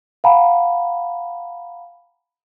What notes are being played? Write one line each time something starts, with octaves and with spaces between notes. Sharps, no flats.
F5 F#5 G#5 A#5 B5